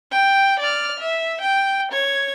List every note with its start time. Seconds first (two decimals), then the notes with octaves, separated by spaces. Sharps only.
0.12 G5
0.60 D5 F6
1.00 E5
1.41 G5
1.92 C#5 G#6